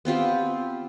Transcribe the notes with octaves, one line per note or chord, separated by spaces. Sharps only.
B3 C4 F4 G4